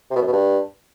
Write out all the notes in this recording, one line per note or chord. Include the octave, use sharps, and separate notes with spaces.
C3
B2
F#2
B2
G2